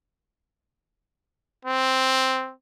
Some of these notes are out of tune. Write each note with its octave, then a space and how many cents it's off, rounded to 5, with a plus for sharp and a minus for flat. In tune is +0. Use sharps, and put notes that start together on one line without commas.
C4 +0